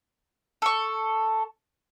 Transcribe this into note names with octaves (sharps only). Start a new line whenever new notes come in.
A4 C#6